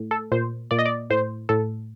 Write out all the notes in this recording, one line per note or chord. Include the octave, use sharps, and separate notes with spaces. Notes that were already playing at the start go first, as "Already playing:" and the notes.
Already playing: A2
A4
A#2 C5
A#2 D5
D#5
D5
A2 C5
A2 A4